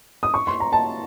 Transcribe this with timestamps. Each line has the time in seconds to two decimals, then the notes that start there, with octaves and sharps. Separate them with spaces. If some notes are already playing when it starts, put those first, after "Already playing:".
0.23 D#6
0.34 C#6
0.47 C6
0.60 A#5
0.72 A5